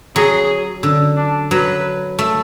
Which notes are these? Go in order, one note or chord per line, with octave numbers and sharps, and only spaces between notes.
F#3 G#4
D3
D4
F#3 B4
A3